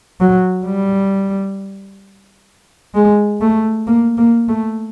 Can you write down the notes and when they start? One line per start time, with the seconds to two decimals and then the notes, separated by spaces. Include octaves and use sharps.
0.20 F#3
0.66 G3
2.95 G#3
3.41 A3
3.87 A#3
4.18 A#3
4.49 A3